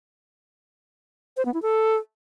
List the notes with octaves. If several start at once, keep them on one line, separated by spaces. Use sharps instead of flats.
C5
B3
E4
A4